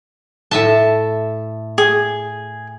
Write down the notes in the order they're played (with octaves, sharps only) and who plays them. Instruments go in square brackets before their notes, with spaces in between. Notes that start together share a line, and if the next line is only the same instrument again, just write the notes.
[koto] A2 E5 A5
[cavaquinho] G#4